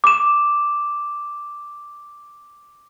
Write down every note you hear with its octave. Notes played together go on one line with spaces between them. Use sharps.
D6 E7